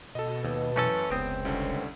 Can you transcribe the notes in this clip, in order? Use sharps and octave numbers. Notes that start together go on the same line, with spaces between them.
B2 A4 D#5
D#2 B4
F#2 E3 A3 C#4 A4
F1 C#2 B3 C4 D#6 D7
C2 D3 C#4 A4